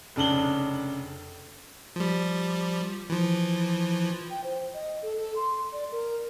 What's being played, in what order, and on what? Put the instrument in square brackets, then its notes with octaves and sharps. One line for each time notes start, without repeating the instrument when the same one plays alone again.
[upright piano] F1 C#3 D4 F#7 G7
[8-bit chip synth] F3 G3
E3 F3
[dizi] G5
C5
D#5
A4
A4
C6
D5
A#4